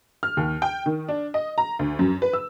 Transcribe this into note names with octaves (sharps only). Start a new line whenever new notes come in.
F6
D#2
G5
D#3
D4
D#5
A#5
D2
F#2
B4
E6